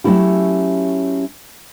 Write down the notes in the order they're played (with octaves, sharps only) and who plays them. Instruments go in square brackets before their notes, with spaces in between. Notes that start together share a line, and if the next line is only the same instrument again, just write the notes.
[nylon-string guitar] F#3 G#3 A3 C#4 E4 G4